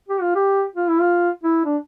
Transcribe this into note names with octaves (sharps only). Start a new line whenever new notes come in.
G4
F4
G4
F4
E4
F4
E4
D4